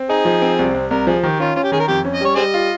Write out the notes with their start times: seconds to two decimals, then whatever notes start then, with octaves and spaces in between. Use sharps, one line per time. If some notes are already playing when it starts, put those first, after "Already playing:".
Already playing: C4
0.09 D#4 G#4
0.25 F3
0.42 C4
0.59 C2
0.74 C2
0.90 C2 A#4
1.07 F3 G#4
1.23 D#3 G4
1.40 C#4 F4
1.56 C#4 F4
1.64 G4
1.72 D#3 G#4
1.80 A#4
1.88 F2 G4
2.05 C#4
2.15 D#5
2.21 G3 C#5
2.36 G3 G#4 C5 D#5
2.54 F4